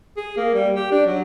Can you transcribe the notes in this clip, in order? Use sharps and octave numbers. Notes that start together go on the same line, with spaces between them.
G#4
A#3
G3
G4
D4
F#3